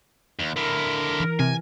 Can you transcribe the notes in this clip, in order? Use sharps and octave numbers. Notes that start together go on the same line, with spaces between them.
D#2
D3 E4 A#4
E3
C3 G#5